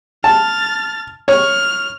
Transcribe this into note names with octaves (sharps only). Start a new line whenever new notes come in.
A5 F6 A6
C#5 F6